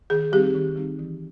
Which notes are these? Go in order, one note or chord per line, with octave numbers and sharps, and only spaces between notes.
D#3 G#4
G3 C4 D#4 G4
D#3
G3 C4 D#4
E3